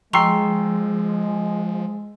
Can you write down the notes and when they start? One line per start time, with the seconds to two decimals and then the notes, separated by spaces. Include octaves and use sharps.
0.13 F3 G#3 G5 A#5 C6 C#6 E6 C7